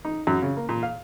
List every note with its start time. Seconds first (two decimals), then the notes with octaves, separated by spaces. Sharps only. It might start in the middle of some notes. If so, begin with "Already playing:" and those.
0.05 D#4
0.27 F#2
0.42 C#3
0.57 A#3
0.69 A#2
0.83 F5